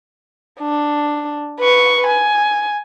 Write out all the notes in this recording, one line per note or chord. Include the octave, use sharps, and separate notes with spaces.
D4
B4 C#6
G#5